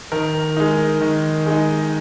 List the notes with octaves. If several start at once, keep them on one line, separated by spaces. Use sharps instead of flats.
D#3 A#4
G#3 D#4
D#3
G#3 D#4